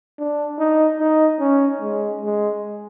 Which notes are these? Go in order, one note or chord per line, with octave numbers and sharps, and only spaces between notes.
D4
D#4
D#4
C#4
G#3
G#3